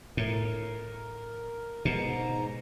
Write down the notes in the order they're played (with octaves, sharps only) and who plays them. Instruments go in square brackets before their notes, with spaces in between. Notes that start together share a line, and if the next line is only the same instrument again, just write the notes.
[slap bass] A2 [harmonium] A#4
[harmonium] G#2 A#5 [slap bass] B2